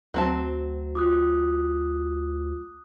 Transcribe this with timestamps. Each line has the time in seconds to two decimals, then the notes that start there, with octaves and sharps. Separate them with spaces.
0.14 D2 F#3 C4 A5
0.95 F4 D6 D#6 F#6